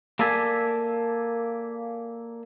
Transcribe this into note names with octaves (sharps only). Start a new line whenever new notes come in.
A#3 A4 D5 E5 G#5